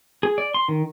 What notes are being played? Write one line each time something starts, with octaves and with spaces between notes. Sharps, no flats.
G#4
D5
C6
D#3